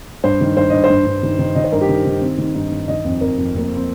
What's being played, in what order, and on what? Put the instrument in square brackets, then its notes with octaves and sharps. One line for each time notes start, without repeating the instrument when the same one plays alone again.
[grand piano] G2 C5
D#3
G2 C5
G2 D#5
C5
G2
G2
D#3
D#3
D#3 D#5
C5
G2 A#4
G4
D#3
D#3
D#3 C4
D#3
G2 D#4
G2
D#3 D#5
F2
F2 A#4
F2
F2 A#3
C4
C4